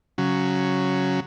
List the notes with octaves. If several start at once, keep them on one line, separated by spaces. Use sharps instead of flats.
C#3 F#3